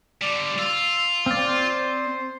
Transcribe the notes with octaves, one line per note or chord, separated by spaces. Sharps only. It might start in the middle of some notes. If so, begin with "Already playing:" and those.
D3 G3 D5
F4 E6
C4 D5 F5
C5